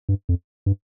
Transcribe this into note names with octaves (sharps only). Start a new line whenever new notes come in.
G2
F2
G2